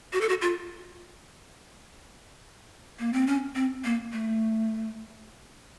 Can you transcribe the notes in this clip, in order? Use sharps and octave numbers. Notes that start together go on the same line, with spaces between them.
F#4
A4
F#4
F4
A#3
C4
C#4
C4
A#3
A3